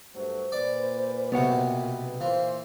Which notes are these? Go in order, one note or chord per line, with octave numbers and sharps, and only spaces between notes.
G2 F#3 A3 C5
A#2 B4 D5
B1 C3 B3 C#5 F#5
A#2 E3 C5 F5